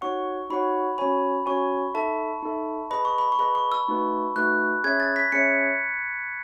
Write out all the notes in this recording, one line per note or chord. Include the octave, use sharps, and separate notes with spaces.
D#4 F#4 C#5 F#5 C#6
D#4 F#4 C#5 F#5 B5
C#4 F#4 C#5 G#5 B5
C#4 F#4 C#5 G#5 C#6
D#4 A4 E5 A5
D#4 A4 E5
G#4 B4 D#5 B5
C#6
B5
C#6
G#4 B4 D#5 B5
C#6
E6
A3 D#4 F#4 B4
A3 D#4 F#4 B4 F#6
C#4 G#4 C#5 E5 G#6
A6
B6
C#4 G#4 C#5 E5 C#7